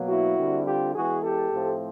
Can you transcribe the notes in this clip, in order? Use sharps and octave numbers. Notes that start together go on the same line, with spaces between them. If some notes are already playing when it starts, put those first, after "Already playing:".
Already playing: B2 F#3 A#3
E4 F#4
D3 G3 C4
F4 G4
E3 G#3 B3 F#4 G#4
G4 A4
A2 F3 A3 C4